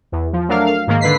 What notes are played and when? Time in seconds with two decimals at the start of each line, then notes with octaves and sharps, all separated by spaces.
0.12 E2
0.33 F3
0.48 F#3 A3 D4 A#4 F5
0.67 F5
0.87 G#2 D#3 A#3
1.01 D3 B4 B6 C7